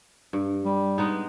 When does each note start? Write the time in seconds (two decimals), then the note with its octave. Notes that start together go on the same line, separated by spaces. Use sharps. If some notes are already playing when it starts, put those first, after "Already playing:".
0.33 G2
0.65 G3
0.98 G#3 B3 D#4